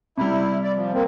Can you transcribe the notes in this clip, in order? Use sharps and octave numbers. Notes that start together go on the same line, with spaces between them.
C3 G3 E4
D5
F3
A#3 C4